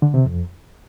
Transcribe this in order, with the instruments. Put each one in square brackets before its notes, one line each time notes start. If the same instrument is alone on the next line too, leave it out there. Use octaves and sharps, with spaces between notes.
[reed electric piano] D3
C3
F2